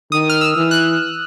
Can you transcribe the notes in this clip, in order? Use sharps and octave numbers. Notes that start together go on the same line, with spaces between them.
D#3 D#6
F6
E6
E3
F#6